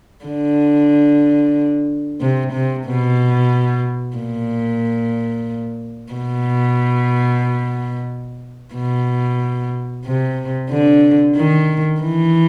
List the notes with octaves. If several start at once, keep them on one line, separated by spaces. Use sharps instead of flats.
D3
C3
C3
B2
A#2
B2
B2
C3
D3
D#3
E3